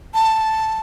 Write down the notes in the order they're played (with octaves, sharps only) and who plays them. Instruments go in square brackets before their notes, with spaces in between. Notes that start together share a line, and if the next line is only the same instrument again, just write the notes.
[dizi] A5